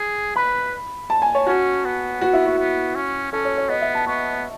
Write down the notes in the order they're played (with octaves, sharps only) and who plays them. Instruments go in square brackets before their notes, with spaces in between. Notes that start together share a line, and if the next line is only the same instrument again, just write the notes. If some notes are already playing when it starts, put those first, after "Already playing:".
Already playing: [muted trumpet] G#4
[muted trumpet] B4 [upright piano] B5
[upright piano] A5
G#5
C#5
[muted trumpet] C#4 [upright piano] F#4
[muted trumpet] B3
[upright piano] F#4
E4
F#4
[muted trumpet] B3
C#4
[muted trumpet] C#4 [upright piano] A4
[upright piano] C#5
C#5
[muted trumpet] B3 [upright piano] D#5
[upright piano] E5
A5
[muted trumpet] B3 [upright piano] C#6